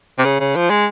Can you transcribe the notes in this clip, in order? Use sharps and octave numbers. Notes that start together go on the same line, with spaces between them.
C3
C#3
C#3
F3
G#3